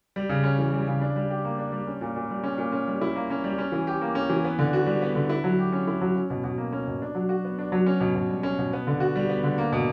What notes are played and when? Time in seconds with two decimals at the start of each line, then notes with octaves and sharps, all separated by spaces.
0.16 G3
0.29 C#3
0.44 C#4
0.59 E3
0.73 G3
0.87 C#3
1.01 D4
1.16 G3
1.30 G4
1.45 A#3
1.58 D4
1.72 G3
1.87 C#4
2.01 A#2
2.16 A#2
2.30 G3
2.44 C#4
2.58 A#2
2.72 C#4
2.88 G3
3.01 E4
3.16 A#3
3.30 C#4
3.44 G3
3.58 C#4
3.72 E3
3.87 G4
4.01 A#3
4.15 C#4
4.30 E3
4.44 B3
4.59 D3
4.73 F#4
4.86 G3
5.02 B3
5.15 D3
5.29 E4
5.44 F#3
5.59 G4
5.73 C#4
5.87 E4
6.01 F#3
6.15 C#4
6.30 B2
6.44 B2
6.58 A#3
6.72 C#4
6.87 B2
7.02 D4
7.15 F#3
7.29 F#4
7.44 B3
7.59 D4
7.72 F#3
7.86 C#4
8.00 B2
8.15 B2
8.30 G3
8.43 C#4
8.58 B2
8.73 B3
8.87 D3
9.00 F#4
9.16 G3
9.29 B3
9.44 D3
9.58 A#3
9.72 B2